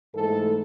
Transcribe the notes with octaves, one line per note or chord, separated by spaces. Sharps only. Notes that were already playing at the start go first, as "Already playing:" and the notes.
G#2 E3 A3 A4